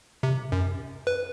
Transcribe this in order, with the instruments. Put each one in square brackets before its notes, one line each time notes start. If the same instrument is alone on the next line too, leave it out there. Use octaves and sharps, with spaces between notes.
[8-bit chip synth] C3
F#2
B4